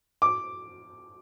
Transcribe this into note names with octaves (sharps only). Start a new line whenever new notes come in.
D6